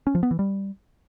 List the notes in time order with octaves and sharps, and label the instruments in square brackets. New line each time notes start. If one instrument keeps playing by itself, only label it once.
[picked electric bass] C#4
F3
B3
E3
G3